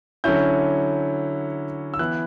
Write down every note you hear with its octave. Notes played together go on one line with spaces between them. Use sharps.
D3 F#3 C#4 E4 G6
E6
E3 B3 E4 F#6